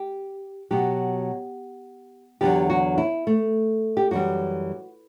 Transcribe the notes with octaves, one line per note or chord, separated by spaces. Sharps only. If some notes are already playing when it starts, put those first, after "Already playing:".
Already playing: G4
B2 F#3 G4
E2 D3 F#3 G4
F#4
E4
A3
G4
F#2 E3 G3 F#4